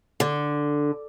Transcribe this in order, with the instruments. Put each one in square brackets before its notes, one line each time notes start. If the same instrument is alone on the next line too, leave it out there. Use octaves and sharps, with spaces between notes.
[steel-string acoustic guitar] D3